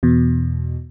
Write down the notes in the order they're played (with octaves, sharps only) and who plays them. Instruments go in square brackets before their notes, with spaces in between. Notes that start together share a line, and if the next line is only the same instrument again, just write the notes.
[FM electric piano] E2 B2